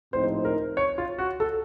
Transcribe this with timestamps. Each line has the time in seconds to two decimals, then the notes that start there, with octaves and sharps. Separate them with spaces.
0.13 A#1 A2 F3 C4 D#4 C5
0.45 A#4
0.77 C#5
0.98 F4
1.18 F#4
1.40 A4